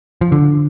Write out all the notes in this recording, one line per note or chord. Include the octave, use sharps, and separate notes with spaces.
F3
D3